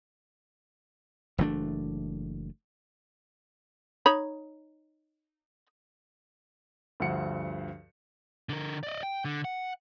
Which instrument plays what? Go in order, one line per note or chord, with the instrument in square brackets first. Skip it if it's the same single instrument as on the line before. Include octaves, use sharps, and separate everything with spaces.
[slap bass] F#1 E3 A3 D4
[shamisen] D#4 C#5 B5
[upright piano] D2 G2 F3 F#5 C#7
[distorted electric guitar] D3 A#4
D5 D#5
G5
D3
F#5